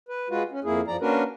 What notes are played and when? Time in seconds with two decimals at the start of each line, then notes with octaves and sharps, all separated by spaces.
0.09 B4
0.30 G#3 F4 F#4 B4
0.51 C#4
0.64 F2 A#3 E4 G#4
0.88 F#2 F3 D5 A#5
1.01 A#3 C#4 D4 F#4 A#4 B4